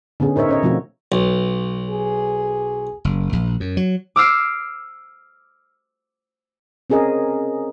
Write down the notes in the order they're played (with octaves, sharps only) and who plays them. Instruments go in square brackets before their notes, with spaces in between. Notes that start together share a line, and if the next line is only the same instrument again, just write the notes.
[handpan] D3 B3 C#4 G#4
D#4 A#4 C5 C#5 E5
C#4 C#5 D#5
B2 F3 A3 C4 F4 F#4
[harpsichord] B1
[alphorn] G#4
[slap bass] F#1
A#1
F#2
F#3
[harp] D6 E6 F6 C7 D7
[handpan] C4 C#4 G#4 A#4 D#5